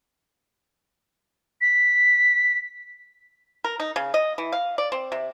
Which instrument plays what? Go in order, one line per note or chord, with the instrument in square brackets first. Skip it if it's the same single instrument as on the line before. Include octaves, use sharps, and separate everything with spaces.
[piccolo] B6
[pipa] A#4
D#4
C#3
D#5
E3
F5
D5
C4
C3